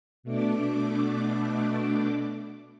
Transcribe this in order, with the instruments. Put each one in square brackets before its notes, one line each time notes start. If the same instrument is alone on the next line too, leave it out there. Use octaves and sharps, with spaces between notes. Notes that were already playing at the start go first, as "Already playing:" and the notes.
[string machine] B2 A3 D4 D6